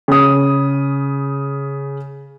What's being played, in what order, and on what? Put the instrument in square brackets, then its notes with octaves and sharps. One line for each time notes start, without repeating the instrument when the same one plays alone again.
[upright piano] C#3 D#6